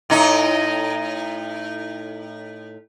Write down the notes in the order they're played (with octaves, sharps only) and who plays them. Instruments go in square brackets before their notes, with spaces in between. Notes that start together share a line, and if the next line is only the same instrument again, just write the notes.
[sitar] A2 D#4